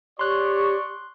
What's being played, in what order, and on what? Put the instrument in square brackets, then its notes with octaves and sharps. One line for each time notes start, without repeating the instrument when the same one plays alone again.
[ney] G4 [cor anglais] C#5 [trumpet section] D5 C#6 [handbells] C6 F#6